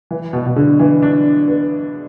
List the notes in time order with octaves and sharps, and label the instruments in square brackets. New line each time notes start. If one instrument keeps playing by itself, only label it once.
[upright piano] E3
B2
B2
D3
E3
D4
B3